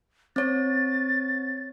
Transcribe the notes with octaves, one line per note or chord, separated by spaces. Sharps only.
C4 C#5 A6